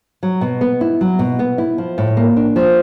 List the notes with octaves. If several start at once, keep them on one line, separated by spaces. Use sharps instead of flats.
F#3
B2
B3
E4
F#3
B2
B3
E4
F3
A2
A#3
D4
F3